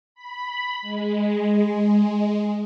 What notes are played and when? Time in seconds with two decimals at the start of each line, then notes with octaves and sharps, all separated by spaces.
0.15 B5
0.82 G#3